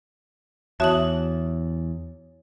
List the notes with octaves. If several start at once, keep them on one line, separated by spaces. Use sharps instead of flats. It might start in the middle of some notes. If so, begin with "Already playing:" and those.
E2 F#4 C#5 E5 A5 D#6 F#7